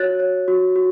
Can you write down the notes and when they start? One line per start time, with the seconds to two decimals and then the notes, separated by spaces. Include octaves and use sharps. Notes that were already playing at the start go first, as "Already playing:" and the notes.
Already playing: F#4 C#5 F#6 A6
0.19 C#5
0.48 F#4
0.76 F#4